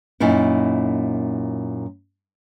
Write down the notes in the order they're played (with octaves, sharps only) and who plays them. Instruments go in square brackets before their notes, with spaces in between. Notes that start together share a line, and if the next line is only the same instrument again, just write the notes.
[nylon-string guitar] F#2 A#2 D#4 E4